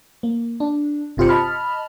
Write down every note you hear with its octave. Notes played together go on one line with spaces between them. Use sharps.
A#3
D4
G1 C3 F4 G4 C5 C#7
D#5 A5 B5 F6